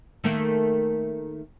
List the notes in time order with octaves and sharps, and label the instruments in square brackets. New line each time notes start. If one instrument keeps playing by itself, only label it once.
[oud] D#3 A3 A#3